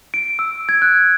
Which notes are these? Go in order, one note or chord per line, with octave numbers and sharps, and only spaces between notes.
D7
E6
G#6
F#6